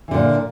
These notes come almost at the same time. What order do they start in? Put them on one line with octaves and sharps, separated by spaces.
E3 D3 A#2